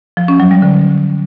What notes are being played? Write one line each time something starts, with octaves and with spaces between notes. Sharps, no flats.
F3
C#4
F#3
G3
D3